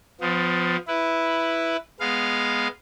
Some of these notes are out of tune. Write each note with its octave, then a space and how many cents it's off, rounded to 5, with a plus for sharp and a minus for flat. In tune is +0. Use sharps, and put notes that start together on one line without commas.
F3 +15 B3 +40
E4 +0 B4 +0
G#3 +0 B3 +0 F5 +0